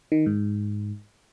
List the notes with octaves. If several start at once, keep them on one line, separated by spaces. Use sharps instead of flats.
D#3
G#2